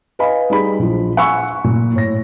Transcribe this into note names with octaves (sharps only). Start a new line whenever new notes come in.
B4 D#5 F5 G#5 B5
G3 D#4 G#4 B5
A#1 F3
F#5 G#5 B5 C#6 E6
A#2
A2 A#6